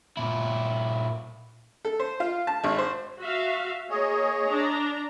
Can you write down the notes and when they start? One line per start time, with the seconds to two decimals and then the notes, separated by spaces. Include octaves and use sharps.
0.17 A#2 E4
1.85 A4
1.99 C5
2.20 F4
2.47 A5
2.64 G#1
2.78 C5
3.20 F#4 E5 F5
3.90 A#3 G#4 C#5 D#5
4.47 D4 A#5